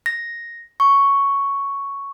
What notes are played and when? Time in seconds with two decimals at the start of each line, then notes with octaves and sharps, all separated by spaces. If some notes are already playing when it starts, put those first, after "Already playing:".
0.06 A#6
0.80 C#6